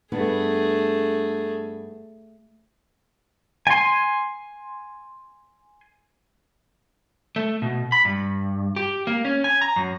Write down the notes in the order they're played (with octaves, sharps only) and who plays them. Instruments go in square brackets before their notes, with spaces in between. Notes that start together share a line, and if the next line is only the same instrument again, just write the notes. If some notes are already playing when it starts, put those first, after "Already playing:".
[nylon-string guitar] G2 B3 D4 [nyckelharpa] A3 G#4
[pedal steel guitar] G#5 C6
[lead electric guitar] A3
B2
B5
G2
G4
A#3
C#4
G#5
A#5
F#2